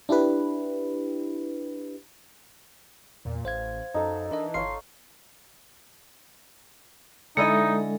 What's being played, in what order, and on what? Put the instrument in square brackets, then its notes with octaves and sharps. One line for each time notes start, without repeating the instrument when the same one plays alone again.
[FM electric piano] D4 E4 G4 B4
[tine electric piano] E2 [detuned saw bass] A#2
[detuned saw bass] A1 [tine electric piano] C5 F5 G#6
[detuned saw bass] F#2 [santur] D#4 A4
[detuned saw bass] E3 [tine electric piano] D4 A#4 D#5
[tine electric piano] G1 C6 C7 [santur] C#5 F5
[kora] D3 E4 D#5 [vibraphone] G#3 A4 [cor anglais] D#4